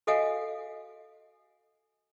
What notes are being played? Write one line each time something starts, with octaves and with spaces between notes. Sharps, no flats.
F#4 A4 D#5 F5 F#5 G#5